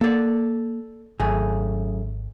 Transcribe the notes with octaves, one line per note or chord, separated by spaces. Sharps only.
A#3 A4 D5
G#1 F#2 A3 G#4